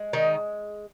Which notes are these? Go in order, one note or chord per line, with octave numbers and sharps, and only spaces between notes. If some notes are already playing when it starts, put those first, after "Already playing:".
Already playing: G#3
D#3 D#4